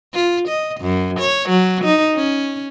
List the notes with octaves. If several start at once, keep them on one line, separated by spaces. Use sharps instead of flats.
F4
D#5
F#2
C#5
F#3
D#4
C#4